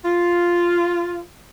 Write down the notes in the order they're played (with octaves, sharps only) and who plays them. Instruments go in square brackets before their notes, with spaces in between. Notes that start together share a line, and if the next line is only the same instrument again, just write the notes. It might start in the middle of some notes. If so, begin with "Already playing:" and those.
[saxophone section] F4